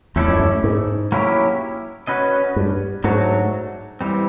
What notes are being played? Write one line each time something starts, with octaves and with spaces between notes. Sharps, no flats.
E2 A3 C#4 E4 A4 D5
F2
F#2
G#2
F#3 A#3 C#4 E4 G4
C#4 F#4 B4 D#5
G2
G#2 F#3 A3 D4 F#4
E3 G3 C4